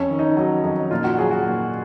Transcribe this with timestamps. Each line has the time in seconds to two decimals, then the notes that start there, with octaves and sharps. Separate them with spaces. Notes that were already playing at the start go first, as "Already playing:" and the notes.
Already playing: F2 C#4
0.10 D#3
0.19 D#4
0.37 F#3
0.64 F2
0.91 A#2 F4
1.04 F#4
1.18 F#3 G#4
1.31 F#4
1.45 A#2